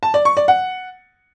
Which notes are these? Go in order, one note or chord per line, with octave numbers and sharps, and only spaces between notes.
A5
D5
C#6
D5
F#5